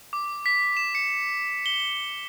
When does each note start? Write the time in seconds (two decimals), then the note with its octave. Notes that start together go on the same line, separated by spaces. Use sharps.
0.13 D6
0.46 B6
0.77 E7
0.95 C#7
1.66 G7